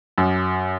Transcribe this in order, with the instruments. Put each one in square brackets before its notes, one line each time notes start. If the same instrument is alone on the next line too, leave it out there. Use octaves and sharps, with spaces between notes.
[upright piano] F#2